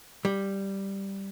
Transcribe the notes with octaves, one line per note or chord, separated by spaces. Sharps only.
G3